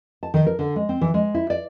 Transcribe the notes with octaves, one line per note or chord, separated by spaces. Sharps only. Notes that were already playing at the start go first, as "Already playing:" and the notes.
A5
D#3
A#4
D3
G#3
C4
E3
G#3
E4
D5